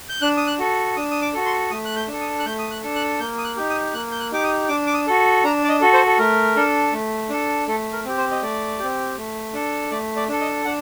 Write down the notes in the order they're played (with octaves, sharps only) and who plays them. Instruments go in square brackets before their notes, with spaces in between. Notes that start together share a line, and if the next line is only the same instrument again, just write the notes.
[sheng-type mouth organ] G6
D4 F#6
D#6
F#6
F#4 A4
D4 D#6
D#6
D6
F#4 A4
C6
A3 D#6
F#6
G6
D4
A4
D#6
F#6
A3 G6
D#6
F#6
D4 A4
F#6
A#3 G6
D#6
F#6
D#4 G4
D#6
A#3 F#6
G6
F#6
D#4 G4 D6
D#6
D4 D6
D6
D#6
F#4 A4
D4 A#5
D5
D#5
F#4 A4
C5
A4
A3 A#4
D4 A4
A3
D4 A4
A3 A4
A#4
C4 G4
C5
D#5
A3 D5
C4 G4
A3
D4 A4
A3 D5
D5
D4 A4
D#5
D4 F#5